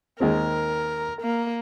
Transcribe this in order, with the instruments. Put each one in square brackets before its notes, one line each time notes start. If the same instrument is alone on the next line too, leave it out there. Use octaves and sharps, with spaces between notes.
[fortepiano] D#2 G#3 C4 [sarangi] A#4
[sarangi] A#3